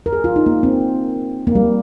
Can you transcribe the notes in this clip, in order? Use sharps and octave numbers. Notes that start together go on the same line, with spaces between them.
A#4
G#4
F4
D#4
A#3
C4
A#3
G3